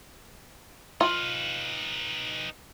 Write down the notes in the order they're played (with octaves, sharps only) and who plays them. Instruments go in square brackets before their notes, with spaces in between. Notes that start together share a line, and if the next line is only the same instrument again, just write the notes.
[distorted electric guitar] D#4 B4 [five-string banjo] F4